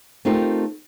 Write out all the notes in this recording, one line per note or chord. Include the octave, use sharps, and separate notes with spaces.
A3 C4 D#4 F4 G4 A#4